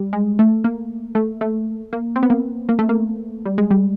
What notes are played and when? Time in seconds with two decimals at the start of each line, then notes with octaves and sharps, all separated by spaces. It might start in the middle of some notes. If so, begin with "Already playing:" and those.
Already playing: G3
0.13 G#3
0.39 A3
0.64 A#3
1.15 A3
1.41 A3
1.93 A#3
2.16 C4
2.23 B3
2.30 A#3
2.69 A#3
2.79 A3
2.89 A#3
3.45 G3
3.58 G#3
3.70 G3